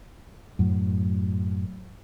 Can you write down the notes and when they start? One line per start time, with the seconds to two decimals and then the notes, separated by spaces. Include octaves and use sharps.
0.59 F#2 A2 F#3